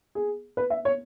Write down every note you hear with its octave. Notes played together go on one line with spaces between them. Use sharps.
G#4
B4
E5
C#5